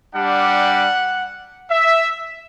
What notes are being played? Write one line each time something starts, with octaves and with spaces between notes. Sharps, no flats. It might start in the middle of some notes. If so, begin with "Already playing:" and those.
G3 D4 G4 F#5
E5